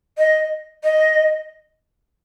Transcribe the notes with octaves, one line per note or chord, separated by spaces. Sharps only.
D#5
D#5